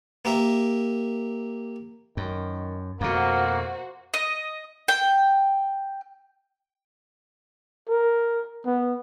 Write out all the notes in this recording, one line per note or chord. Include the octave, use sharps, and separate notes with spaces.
A#3 G4 A#4 E5
F#2 D#3
F2 B2 A#3 F#4 C5
D#5
G5
A#4
B3